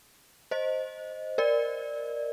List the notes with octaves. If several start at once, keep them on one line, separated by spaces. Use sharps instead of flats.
C5 D#5
A#4 D5